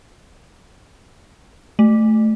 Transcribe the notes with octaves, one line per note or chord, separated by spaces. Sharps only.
A3